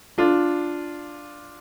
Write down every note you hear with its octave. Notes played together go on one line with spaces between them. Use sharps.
D4 F4